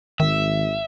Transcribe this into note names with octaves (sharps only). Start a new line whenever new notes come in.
G#1 D#3 E5